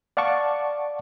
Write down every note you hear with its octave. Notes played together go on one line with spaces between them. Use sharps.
D5 F5 F#5 A5 C#6 D6